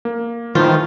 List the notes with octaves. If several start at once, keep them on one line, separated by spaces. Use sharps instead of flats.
A#3
D#3 E3 A3 F4 C5